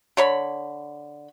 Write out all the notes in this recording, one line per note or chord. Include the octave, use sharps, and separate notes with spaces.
D3 C#5 B5